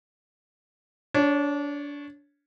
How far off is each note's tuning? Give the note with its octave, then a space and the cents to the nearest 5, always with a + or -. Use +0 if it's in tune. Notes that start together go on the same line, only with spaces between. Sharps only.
D4 -25 C#5 +0